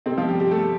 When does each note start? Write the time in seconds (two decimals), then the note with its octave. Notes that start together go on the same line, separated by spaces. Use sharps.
0.06 C3 C4
0.18 F3 F4
0.29 G3 G4
0.40 G3 G4
0.51 A3 A4